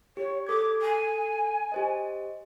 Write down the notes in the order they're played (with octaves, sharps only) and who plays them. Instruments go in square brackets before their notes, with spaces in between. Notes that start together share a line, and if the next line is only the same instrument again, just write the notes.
[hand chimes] G4 [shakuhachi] C#5
[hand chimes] A4 G#6 [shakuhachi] D6
[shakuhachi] G#5
[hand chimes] G4 C5 D#5